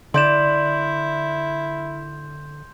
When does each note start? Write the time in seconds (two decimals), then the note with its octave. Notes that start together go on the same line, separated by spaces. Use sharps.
0.14 D3 E4 D5 C6 G6 E7